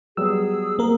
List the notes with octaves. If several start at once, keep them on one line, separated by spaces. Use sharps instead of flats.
F#3 G3 B3 G#4 E6
A#3 A#4